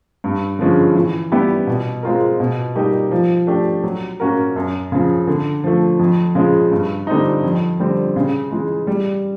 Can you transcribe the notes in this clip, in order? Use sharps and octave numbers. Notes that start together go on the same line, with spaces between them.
G2
D3 F3 G#3 C#4
E3
G3 B3 E4 G4
B2
G#3 C4 F4 A#4
B2
G3 A#3 D#4 G4
F3
A3 D4 G4
F#3
A#3 C#4 F#4 A#4
F#2
C#3 F3
D3
F3 A3
F2
C#3 F3 G#3
G2
D3 G3 C4 D#4
F2
D3 G3 C4
C#3
E3 G#3
G3